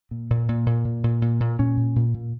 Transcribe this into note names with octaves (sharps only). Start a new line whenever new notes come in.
A#2
A#2
A#2
A#2
A#2
A#2
A#2
A#2
A#2 C#4
A#2
A#2
A#2